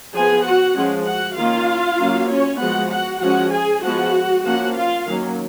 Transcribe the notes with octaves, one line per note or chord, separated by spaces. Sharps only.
F3 B3 G#4 G#5
F#4 F#5
F3 G#3 C#4
F#4 F#5
D#3 A#3 C#4 F4 F5
F#3 A#3 C#4
C#4 C#5
F3 G#3 B3 F#4 F#5
F#4 F#5
F3 G#3 C#4 F#4 F#5
G#4 G#5
F3 G#3 B3 F#4 F#5
F3 A#3 C#4 F#4 F#5
F4 F5
D#3 F#3 A#3 C#4